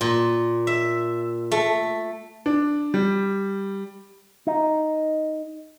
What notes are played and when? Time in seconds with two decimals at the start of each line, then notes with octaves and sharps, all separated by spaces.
0.01 A#2
0.67 E5
1.52 A3
2.46 D4
2.94 G3
4.47 D#4